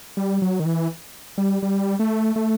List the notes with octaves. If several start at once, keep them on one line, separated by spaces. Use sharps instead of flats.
G3
F#3
D#3
E3
G3
G3
A3
A3